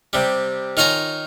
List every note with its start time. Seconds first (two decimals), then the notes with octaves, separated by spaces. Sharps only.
0.13 C3 G3
0.77 D#3 F4 C#5 G#5 A#5